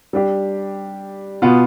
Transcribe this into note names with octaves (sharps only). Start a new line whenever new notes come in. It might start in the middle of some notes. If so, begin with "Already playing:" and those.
G3 D4 G4
B2 B3 F4